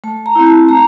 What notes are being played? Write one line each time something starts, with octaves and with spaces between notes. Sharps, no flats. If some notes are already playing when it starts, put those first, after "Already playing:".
A3 A5
A#5
C4 E4
A5
A3 A#5